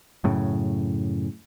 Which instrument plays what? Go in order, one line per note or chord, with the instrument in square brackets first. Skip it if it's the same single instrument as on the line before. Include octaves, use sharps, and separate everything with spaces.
[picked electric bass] F#2 A2 C#3